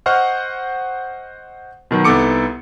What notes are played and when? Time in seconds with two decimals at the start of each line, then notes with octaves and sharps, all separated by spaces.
0.06 C5 D#5 F#5 C#6 F6
1.91 B2 D#3 F#3
2.04 C2 B3 D#4 A4 D6 C#7